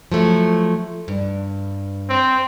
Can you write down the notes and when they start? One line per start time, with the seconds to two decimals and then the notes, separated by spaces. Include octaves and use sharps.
0.12 F3 F#3 A3
1.08 G2
2.09 C4